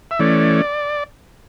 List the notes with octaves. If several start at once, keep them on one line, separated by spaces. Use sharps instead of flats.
E5
E3 A3 C#4 D5